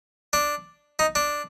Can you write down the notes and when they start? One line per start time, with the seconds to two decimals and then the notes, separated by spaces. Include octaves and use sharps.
0.33 D4
0.99 D#4
1.15 D4